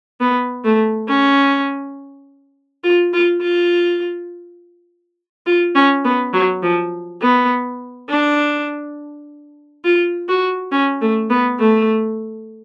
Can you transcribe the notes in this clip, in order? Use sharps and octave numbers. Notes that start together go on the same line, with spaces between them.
B3
A3
C#4
F4
F4
F4
F4
C#4
B3
F#3
F3
B3
D4
F4
F#4
C#4
A3
B3
A3